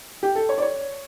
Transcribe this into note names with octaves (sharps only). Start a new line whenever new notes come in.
G4
A4
C#5
D5
C#5